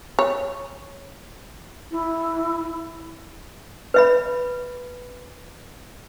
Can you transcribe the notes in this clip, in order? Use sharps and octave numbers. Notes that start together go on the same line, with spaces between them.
C#5
E4
B4 E5 B5